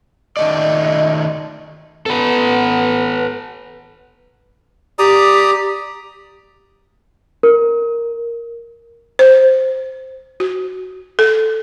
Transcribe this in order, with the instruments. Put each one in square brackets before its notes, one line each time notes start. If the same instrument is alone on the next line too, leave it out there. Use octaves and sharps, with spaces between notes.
[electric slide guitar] D#3 A3 D5 [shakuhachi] D#5
[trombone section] B3 [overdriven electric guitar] A4 B4
[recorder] G4 [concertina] D5 A#5 D#6
[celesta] A#4
[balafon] C5
F#4
A4